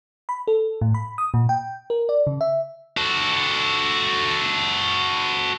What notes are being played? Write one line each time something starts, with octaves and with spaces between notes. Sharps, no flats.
B5
A4
A2
B5
D#6
A#2
G5
A#4
D5
C#3
E5
F#4 A4